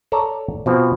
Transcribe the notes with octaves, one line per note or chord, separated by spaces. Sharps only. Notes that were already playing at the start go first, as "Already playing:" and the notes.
A4 C#5 D5 A#5
B2 F3 C4